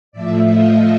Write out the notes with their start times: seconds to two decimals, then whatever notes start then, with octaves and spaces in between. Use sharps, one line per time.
0.12 A2 F3 A3 D5 E5
0.47 D#5 F5